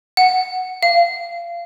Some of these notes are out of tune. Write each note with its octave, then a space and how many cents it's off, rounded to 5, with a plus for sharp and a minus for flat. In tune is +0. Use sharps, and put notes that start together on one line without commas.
F#5 +5
F5 -25